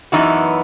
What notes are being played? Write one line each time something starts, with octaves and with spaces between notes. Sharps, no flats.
F#2 E3 B3 D#4 F#4